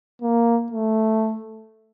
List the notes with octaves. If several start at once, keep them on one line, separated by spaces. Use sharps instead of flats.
A#3
A3